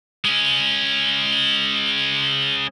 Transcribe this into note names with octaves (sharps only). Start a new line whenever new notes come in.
G#3 C#4